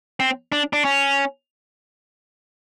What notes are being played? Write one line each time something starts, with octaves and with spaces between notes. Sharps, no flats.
C4
D4
D4
C#4